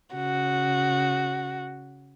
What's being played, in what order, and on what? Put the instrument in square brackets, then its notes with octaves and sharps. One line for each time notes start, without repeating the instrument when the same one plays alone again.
[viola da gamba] C#3 [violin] F#4